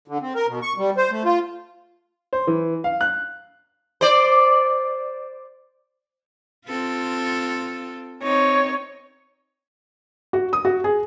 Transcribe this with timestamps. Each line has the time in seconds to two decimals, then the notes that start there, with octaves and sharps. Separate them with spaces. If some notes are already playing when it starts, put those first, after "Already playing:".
0.08 D3
0.21 C4
0.35 A#4
0.48 B2
0.62 C#6
0.77 G3
0.97 C5
1.11 A3
1.25 F4
2.33 C5
2.47 E3
2.84 F5
3.01 F#6
4.01 C5 D5
6.67 C4 F4 A4
8.23 C4 D#4 C#5
10.33 F#4
10.53 D#6
10.65 F#4
10.84 G#4